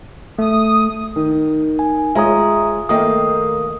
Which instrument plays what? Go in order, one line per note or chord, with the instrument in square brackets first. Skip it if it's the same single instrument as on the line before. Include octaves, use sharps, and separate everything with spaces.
[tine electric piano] A3 [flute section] D#6
[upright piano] D#3
[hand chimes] G#5
[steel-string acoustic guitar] G#3 [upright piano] F4 C#5 [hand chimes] E5 A#5 D#6
[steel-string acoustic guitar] D#3 A#3 F5 [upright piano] A3 G5 [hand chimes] D#6